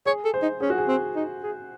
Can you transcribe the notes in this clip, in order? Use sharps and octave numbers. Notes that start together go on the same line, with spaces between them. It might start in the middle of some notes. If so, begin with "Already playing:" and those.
G#4 C#5
A4
C5
D#4
C#4 G#4
F#4
G#4
C4
D#4
G#4